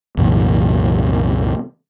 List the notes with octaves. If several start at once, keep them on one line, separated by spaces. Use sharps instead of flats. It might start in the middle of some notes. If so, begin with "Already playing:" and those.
C2 F#2 A#2 E3